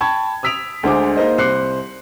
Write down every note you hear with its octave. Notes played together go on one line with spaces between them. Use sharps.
G5 A5 B5 C#6 G#6
D#6 E6 B6 D7 F7
D2 G#3 D4 C5 G#5 D6
A#3 D#4 G#4 A#4 C5 D#5
C2 C5 D6 F#6 C7 C#7